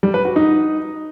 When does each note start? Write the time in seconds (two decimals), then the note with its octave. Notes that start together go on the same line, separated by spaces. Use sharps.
0.03 G3
0.14 B4
0.25 F#4
0.36 D#4